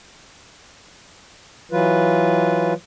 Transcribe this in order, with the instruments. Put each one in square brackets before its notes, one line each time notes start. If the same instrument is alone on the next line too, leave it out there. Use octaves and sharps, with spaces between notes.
[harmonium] E3 F#3 F4 B4